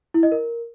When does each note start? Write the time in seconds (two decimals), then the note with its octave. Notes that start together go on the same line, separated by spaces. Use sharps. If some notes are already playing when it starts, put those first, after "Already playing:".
0.14 E4
0.23 D#5
0.32 A#4